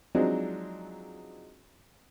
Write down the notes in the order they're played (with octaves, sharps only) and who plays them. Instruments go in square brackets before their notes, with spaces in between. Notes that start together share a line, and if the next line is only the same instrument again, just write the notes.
[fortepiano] F3 F#3 G#3 C4 D4 D#4